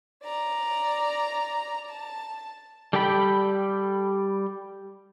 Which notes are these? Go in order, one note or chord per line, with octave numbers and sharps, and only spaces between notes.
D5 A#5
A5
G3 G4 A4 G5 B5